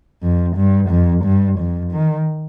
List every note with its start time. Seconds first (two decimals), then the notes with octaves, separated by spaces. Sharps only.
0.22 F2
0.56 G2
0.89 F2
1.24 G2
1.59 F2
1.92 D#3